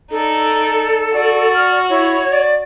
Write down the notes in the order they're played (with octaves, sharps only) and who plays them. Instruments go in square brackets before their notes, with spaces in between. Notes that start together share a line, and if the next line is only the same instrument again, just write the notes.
[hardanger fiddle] D#4 D5 [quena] A4
[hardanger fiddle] F#4 [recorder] D5
[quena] F6
[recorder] E4 [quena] C#5
[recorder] D5